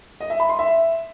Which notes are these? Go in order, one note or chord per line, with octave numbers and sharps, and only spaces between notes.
D#5
E5
B5
C6
E5